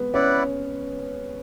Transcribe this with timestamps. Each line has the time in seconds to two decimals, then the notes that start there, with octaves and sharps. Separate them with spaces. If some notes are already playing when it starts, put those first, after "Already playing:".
Already playing: G#3 B3
0.14 C#4 E4 B4 D5 F#5